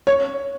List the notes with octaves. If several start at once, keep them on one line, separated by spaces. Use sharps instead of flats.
C#5